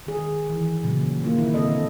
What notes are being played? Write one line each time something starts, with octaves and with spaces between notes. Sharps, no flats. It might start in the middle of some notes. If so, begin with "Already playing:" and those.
D#3 G#4
E3
A#2 C#3 F#3
D#3 A#3 F4
E4
B2 D3 C4 A4 D#5